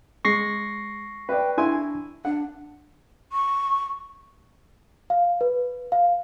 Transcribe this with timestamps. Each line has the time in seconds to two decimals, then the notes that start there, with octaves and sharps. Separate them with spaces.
0.25 G#3 C#6 A#6 C7
1.29 B4 D5 G5
1.58 D4 E4 G#5 C6
2.25 D4 F#5
3.32 C#6
5.10 F5
5.41 B4
5.92 F5